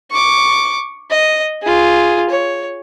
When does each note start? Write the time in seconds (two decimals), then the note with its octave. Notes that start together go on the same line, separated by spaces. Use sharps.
0.11 C#6 D6
1.11 D#5
1.62 F4 G#4
2.30 C#5